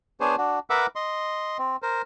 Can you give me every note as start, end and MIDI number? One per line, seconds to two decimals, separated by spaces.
0.20 0.36 59
0.20 0.36 62
0.20 0.36 68
0.20 0.36 72
0.20 0.36 73
0.38 0.59 62
0.38 0.59 66
0.70 0.87 70
0.70 0.87 71
0.70 0.87 76
0.70 0.87 78
0.70 0.87 86
0.70 0.87 88
0.96 1.57 75
0.96 1.57 84
1.59 1.76 60
1.82 2.02 70
1.82 2.02 72